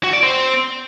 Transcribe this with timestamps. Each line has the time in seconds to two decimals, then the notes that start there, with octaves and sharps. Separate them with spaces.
0.04 F#4
0.13 D5
0.23 C4